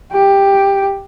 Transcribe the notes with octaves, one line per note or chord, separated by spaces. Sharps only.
G4